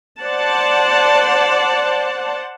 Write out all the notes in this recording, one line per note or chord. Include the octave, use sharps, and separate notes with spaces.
C5 D5 F#5 A5